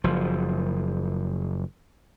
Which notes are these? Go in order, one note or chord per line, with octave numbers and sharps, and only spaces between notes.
F#1 F3